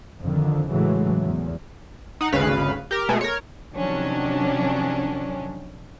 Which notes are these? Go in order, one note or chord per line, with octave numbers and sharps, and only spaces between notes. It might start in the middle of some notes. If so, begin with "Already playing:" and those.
F2 D3 D#3
A2 C#3 E3 F#3 G#3 A3
E2
D#4 F#5
G#1 D2 C#3 B4 F5
G4 A#4
B2 G#3 A3
A#4 C#5
C3 D#3 F3 F#3 C#4 D4